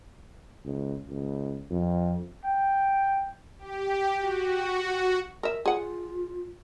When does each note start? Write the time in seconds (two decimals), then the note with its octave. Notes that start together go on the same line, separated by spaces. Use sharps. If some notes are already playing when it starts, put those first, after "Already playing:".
0.65 C#2
1.09 C#2
1.70 F2
2.45 G5
3.58 G4
4.19 F#4
5.43 A#4 E5
5.66 F4 G#4 F#5